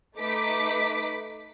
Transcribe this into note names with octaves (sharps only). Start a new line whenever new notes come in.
A3 D#4 B4 D6 B6